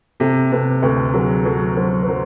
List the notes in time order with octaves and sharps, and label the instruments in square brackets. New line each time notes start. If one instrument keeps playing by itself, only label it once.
[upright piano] C3 [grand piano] G4 A4
[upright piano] C3 [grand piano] A4 B4
[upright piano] D2 [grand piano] A4 B4
[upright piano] F#3 [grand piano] G#4 A#4
[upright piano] F#3 [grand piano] A4 B4
[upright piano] F#3 [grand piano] A#4 C5
[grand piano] B4
[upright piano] F#3 [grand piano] A#4 C5